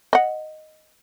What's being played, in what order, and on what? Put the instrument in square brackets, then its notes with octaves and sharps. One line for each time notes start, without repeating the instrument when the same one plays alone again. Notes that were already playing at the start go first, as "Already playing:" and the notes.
[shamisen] D#5 F#5